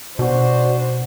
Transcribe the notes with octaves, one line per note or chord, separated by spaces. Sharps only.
B2 D4 F#4 C5